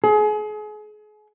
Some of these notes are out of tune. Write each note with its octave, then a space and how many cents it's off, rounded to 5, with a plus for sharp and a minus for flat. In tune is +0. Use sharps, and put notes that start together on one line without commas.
G#4 +35